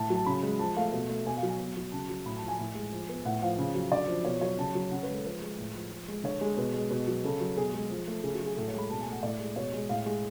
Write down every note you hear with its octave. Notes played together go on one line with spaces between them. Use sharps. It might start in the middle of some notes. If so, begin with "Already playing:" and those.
Already playing: A2 A5
F#3
A5
C#3 B5
G#3
F3 A5
A3 F5
B2
A3
B2 G#5
F5
F#3 G#5
B2
F#3
C#3 A5
F#3
A2 B5
A5
F3
G#5
A2
G#3
F3
B3
A2 F#5
F3 F5
C#3
F#3
D3 D5
F3
B2 C#5
F#3 C#5
C#3 A5
F#3
C#3 F#5
B4
G#3
A4
F3 B4
G#3
A2
F3
F3
G#3
D3 C#5
G#3
B2 B4
G#3
B2
F#3
C#3 A4
F#3
B2 G#4
G#3
F3
A3
C#3 G#4
F#4
F#3
G#4
A2 A4
C#5
G#3 B5
B2 A5
G#5
A3
F#5
A2 D5
G#3
B2 C#5
G#3
A2 F5
G#3